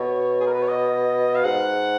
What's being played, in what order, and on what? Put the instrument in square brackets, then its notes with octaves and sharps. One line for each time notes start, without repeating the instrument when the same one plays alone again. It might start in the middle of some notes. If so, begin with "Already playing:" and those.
Already playing: [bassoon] B2 [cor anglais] C#5
[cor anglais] G#4
A#4
B4
C#5
D#5
F5
[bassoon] G#2 [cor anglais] F#5